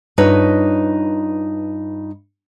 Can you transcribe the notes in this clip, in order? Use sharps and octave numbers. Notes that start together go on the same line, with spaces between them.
G2 D#4 F4 B4 C#5